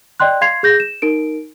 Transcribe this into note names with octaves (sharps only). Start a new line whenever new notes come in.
D5 D#5 G5 C6 F#6
F5 C6 G#6 C7 F7
G#4 G6 A#6
E7
D#4 A#4 D7